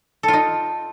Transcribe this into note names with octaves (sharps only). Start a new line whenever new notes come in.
A4
F4
D#4